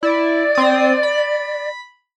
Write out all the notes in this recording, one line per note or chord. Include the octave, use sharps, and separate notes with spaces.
E4 D5
C4 D#6
B5